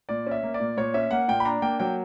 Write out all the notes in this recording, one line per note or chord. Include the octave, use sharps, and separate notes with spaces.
A#2 D5
C#4 E5
A#3
D5
A#2
A#2 C#5
C#4 E5
A#3 F#5
A#2 G5
B5
D4 A#5
A#3 G5
F#3 G5